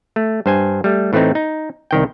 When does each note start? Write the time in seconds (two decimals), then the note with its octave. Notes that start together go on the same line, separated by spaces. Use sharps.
0.16 A3
0.46 G2 C5 G#5
0.84 G3 A3
1.13 A2 E3 A3 C4 D#4
1.35 D#4
1.91 C2 D#3 G5